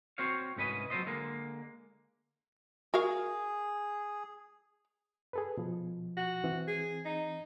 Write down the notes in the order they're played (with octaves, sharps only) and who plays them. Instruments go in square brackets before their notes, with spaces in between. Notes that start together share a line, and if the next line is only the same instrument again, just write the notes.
[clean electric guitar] C4 F#4 C5 C#5 F5
C2 G#2 C#4 B4 D#5
F#3 C4 C#4 F4 C5 D#5
D3 G#3 A#3
[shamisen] F#4 A#4 F5 [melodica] G#4
[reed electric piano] G#4 A4 B4
B2 F3
[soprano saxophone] F#4
[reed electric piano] E3 C4
[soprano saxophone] G#4
D#4